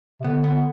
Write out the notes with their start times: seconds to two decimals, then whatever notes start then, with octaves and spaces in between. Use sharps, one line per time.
0.20 C3
0.24 D3 B3
0.44 B3